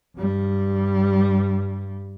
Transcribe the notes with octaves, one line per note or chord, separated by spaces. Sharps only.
G2 G3